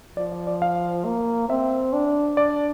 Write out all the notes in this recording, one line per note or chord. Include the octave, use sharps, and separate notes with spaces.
F3 D5
D5
D5
F5
A#3
C4 E5
D4
D5